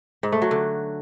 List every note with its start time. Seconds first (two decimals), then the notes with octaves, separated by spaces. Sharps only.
0.23 G#2
0.32 A3
0.42 F#3
0.51 D3